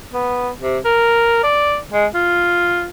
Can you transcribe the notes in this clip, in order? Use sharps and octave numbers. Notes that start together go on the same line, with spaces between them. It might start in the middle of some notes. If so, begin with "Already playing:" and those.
B3
C3
A#4
D5
G#3
F4